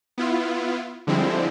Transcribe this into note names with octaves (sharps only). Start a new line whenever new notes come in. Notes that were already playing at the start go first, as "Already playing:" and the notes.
B3 E4 F4
D3 F3 G3 G#3 C4 E4